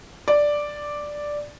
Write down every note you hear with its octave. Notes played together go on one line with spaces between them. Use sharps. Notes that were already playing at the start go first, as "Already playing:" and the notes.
D5